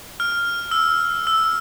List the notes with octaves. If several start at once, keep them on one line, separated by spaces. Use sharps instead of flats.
F6
E6
E6